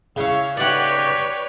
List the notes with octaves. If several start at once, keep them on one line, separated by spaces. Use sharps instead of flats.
C#3 E4 C#5 F5
D#4 G4 B4 C#5 D5 F#5